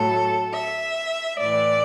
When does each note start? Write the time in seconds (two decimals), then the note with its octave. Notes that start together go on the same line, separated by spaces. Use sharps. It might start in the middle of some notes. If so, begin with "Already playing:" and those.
Already playing: A2 F#3 A4
0.54 E5
1.39 A2 E3 D5